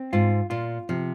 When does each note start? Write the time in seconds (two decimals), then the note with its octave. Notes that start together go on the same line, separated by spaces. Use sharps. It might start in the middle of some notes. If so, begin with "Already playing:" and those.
Already playing: C4
0.13 G#2 F4
0.50 A#2 F4
0.89 C3 F3